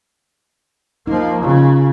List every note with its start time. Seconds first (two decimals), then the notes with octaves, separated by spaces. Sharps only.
1.07 F3 A#3 D#4
1.43 C#3 F4